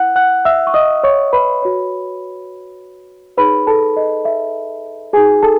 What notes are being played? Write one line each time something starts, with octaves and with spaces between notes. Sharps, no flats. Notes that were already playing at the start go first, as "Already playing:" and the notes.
Already playing: E4 B4 F#5 F#6
F#5 F#6
E5 E6
C#6
D#5 D#6
C#5 C#6
B4 B5
F#4 C#5
D#4 G#4 B4 C#5 B5
A4 A5
D#5
E5
D#4 F#4 G#4 B4 G#5
A4 A5